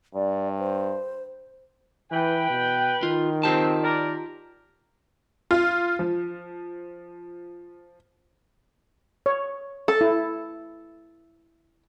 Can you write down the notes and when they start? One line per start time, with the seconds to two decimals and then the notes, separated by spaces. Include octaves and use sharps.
0.15 G2 D5
0.59 C5
2.12 E3 B4 G5
2.50 B2
3.03 D#3 F4
3.43 C4 F4 G4 A5
3.84 A#4 D5
5.51 F4
5.99 F3
9.26 C#5
9.88 A4
10.01 E4